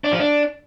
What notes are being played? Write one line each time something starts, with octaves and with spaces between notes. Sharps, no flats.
D4
F3
D4